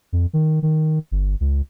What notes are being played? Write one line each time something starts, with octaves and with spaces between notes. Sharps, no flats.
F2
D#3
D#3
G1
C#2